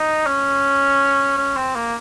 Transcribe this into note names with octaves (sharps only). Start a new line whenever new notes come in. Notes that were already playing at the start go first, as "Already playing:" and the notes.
Already playing: D#4
C#4
C#4
C4
A#3